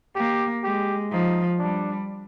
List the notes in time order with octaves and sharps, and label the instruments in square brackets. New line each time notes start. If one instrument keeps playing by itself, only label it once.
[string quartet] A#3 [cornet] G4
[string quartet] G#3 [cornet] G4
[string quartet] F3 [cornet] D#4
[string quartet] G3 [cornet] D4